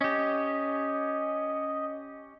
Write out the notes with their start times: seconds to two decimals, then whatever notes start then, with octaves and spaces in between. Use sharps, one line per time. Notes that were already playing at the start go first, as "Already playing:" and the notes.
0.01 C#4 G4 D#5